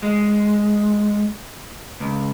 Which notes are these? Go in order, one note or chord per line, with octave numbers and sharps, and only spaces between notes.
G#3
C#2